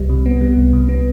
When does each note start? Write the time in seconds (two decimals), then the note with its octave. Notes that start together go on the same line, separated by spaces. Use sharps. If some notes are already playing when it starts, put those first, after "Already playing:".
Already playing: C2 G3
0.09 C3
0.26 B3
0.41 G3
0.57 C2
0.73 C3
0.89 B3